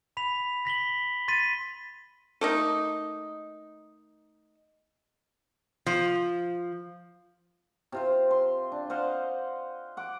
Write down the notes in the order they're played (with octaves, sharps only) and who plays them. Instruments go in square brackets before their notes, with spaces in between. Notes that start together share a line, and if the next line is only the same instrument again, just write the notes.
[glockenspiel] B5 B6 F7
A#6 B6 F#7 G7
C6 A6 B6 D#7
[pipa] A3 A#3 D#4
[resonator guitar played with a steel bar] F3
[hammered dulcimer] C3 F4 C5
C6
D4
C5 D#5 F5 F#5
F#5 D6